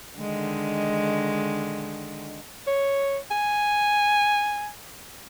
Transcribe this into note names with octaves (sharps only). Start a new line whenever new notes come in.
D3 D#3 G#3
C#5
G#5